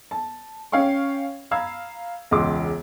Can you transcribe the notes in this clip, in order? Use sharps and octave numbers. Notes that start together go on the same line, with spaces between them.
A5
C#4 C#5 F5 G5 C#6
F5 A#5 B5 E6 G#6
E1 C#2 G#3 C6 D6